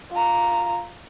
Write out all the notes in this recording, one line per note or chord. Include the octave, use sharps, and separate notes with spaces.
F4 A#5